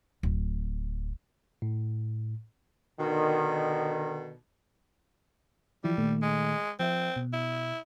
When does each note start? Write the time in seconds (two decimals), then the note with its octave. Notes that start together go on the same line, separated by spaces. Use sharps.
0.23 D1
1.62 A2
3.00 B2 D3 D#3
5.84 E3 F3 G3 E4
5.98 A#2 D#3 A3
6.23 G#3
6.80 F3 C4 E5
7.16 B2
7.33 E4